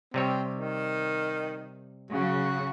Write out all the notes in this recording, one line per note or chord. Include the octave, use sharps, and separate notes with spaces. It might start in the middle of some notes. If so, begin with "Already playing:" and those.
C3 G3 C4 C#5
D#3
C#3 F#3 F#4